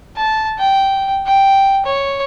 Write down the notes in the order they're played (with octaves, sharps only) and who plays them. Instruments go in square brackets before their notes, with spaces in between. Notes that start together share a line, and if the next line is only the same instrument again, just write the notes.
[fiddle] A5
G5
G5
C#5